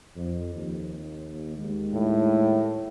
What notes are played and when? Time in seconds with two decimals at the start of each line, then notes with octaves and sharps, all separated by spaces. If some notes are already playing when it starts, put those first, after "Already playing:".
0.16 F2
0.54 D#2
1.56 D#2 G#3
1.94 A2